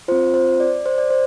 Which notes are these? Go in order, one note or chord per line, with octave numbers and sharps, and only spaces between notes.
C4 F4 C5
C5
D5
C5
D5
C5